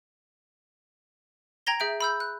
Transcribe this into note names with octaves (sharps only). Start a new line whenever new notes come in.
G5 A#5 G#6 A#6 G7
G#4 E5 G6 D7
B5 E6 G6
F#6